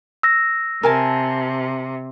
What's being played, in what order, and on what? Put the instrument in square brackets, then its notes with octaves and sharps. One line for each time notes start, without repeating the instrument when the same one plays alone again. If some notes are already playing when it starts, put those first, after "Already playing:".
[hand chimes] E6 A#6
[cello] C3 [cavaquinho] A#4 G#5 A5